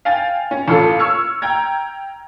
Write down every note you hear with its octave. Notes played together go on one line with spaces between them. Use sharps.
F5 G5 G#5 A6
C#4
A1 F4 A4
C#6 E6 F6 G#6 C#7
G5 A#5 G#6